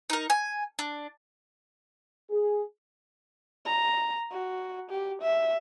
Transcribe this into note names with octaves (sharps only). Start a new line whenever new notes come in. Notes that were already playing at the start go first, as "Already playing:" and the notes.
D#4 A#4
G#5
D4
G#4
A#5
F#4
G4
E5